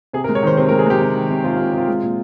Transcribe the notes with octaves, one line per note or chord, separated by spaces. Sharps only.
C3 G#4
A#4
G#3
C#5
D#3 C5
C3 C5
A#4
G#3
G#4
G#3 G4
C3
D#3
C3
C3 F4
F4
C3
C3 F4
G#3
A#2